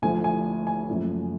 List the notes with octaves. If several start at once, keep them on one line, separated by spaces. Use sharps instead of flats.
D2 D3 F3 A3 G#5
G#5
G#5
F#1 F#2 F3 A3